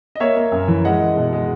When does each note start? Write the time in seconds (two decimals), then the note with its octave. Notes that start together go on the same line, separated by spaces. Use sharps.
0.15 D#5
0.20 A#3 C#5 E5
0.36 A#3
0.52 F#2
0.68 E3
0.84 G#3 D#5 F#5
1.00 G#3
1.17 B2
1.33 G#3